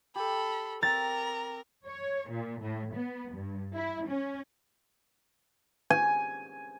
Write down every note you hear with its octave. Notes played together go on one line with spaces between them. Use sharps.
G4 A4 B5
C4 A#4 D5 A#5 A6
C#5
A#2
A2
B3
G2
E4
C#4
G#5